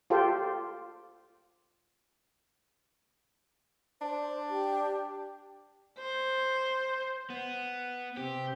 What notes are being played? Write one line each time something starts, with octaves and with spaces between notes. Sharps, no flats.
F4 G4 A4 C5
D4 C5
G4
C5
B3
C3 C4 G4